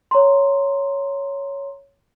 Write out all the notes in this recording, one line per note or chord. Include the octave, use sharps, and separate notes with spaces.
C#5 A#5 C6